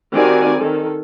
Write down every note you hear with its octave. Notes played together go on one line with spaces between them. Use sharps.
D#3 G3 C4 F#4 D5 G#5
D#3 A4